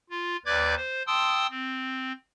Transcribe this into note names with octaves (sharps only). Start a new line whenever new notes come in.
F4
D#2 B4 D5 D6 G6 G#6
C5
G5 A5 C6 D#6 E6
C4